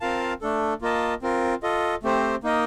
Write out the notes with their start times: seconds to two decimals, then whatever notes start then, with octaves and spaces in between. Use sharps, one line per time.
0.01 C4 F4 A#4 F5 A5
0.41 A3 D4 A4
0.82 A#3 F4 A#4 D#5 A5
1.22 C4 F4 A#4
1.63 F4 A4 D#5
2.03 A3 C4 G4 C5
2.43 A#3 D#4 A#4 D#5